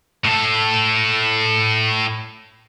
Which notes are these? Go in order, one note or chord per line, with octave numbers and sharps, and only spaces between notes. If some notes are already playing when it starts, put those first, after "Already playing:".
A2 A4